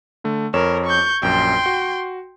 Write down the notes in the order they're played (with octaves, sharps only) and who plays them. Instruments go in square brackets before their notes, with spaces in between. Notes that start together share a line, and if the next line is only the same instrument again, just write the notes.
[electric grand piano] D3 A3
[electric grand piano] F2 C#5 E7 [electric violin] A#4
[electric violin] C#6 G6
[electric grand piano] A#1 F#2 [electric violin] G5 C6
[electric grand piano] F#4